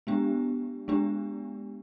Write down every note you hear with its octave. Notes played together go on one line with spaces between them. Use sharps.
G#3 B3 D4 G4
G#3 B3 D4 G4